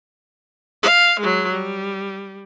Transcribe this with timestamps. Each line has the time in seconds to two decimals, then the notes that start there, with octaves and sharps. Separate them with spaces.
0.83 F5
1.20 F#3 G#3
1.52 G3